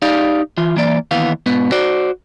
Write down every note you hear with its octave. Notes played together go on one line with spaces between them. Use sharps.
D#4 G4 D5 F5
E3 F4
E3 A#3 D5
D#2 E3 B3 F5
G#2 B2 B3
F#4 C5 D5